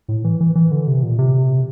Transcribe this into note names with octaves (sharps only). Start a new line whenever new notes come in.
A2
E3
E3
E3
D3
C3
A#2
C3